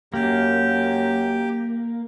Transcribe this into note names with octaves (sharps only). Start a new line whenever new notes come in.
F#2 A#3 G4